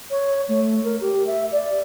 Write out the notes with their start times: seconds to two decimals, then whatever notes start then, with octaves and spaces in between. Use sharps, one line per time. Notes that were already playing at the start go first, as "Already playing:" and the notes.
0.11 C#5
0.49 A3
0.84 A#4
1.01 G4
1.27 E5
1.52 D5